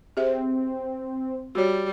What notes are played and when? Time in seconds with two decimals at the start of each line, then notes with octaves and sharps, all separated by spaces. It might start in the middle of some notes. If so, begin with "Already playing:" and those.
0.17 C4 G4 G#4 E5
1.55 G3 F#4 C#5